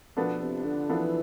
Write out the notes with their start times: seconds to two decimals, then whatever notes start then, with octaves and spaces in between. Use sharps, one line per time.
0.17 B2 F3 B3 D4 A4
0.41 C3
0.65 D3
0.89 E3 F3 B3 D4 A4